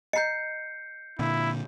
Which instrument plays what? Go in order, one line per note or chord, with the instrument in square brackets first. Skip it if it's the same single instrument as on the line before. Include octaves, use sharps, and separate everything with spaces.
[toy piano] D#5 A#5 [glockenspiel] G6 C7 C#7
[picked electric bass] A#2 D3 [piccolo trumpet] E4